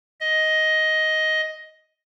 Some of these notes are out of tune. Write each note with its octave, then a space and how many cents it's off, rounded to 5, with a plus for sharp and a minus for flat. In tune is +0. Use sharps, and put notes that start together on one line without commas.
D#5 +10